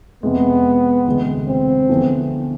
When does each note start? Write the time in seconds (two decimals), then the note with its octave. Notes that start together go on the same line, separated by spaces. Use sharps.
0.23 F2 C3 G#3 B3
1.06 E1 D2 C3 G#3
1.48 C4
1.89 E2 D3 F3 B3 E4